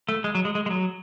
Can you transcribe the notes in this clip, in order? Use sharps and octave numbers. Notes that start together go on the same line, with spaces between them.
A3
G#3
F#3
G#3
G#3
G#3
F#3